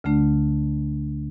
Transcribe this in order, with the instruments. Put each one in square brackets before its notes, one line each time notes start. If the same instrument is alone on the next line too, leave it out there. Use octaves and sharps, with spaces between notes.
[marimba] D2 D3 A3 D4